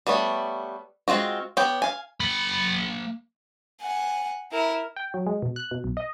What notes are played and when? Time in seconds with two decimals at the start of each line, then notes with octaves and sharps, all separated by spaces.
0.07 G3 A3 B3 C#5
1.08 G#3 C4 F4 F#4
1.57 B3 G4 C#5 G5
1.82 F5 G#5
2.20 A#3 B5
3.81 F#5 G#5
4.51 E4 A#4
4.96 G5
5.14 F#3
5.27 G#3
5.42 B2
5.56 F#6
5.71 B2
5.84 B1
5.97 D#5